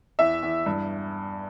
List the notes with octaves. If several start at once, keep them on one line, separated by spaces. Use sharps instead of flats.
E2 E5
E2
G2